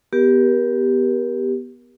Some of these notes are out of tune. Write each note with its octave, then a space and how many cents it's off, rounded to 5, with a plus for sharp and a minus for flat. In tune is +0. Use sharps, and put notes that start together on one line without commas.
B3 +0 G4 +0 A#4 +30